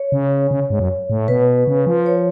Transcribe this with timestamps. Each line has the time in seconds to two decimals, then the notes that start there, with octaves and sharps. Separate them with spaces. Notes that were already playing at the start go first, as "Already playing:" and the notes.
Already playing: C#5
0.12 C#3
0.51 C#3
0.70 G#2
0.80 F#2
1.10 A2
1.28 B2 B4
1.67 C#3
1.87 F3
2.06 C#5